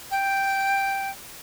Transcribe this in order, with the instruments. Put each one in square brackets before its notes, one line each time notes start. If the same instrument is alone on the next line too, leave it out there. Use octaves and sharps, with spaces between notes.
[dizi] G5